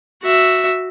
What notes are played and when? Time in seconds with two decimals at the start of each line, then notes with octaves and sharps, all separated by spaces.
0.23 F#4 E5